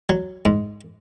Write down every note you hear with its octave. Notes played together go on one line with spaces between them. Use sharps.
F#3
G#2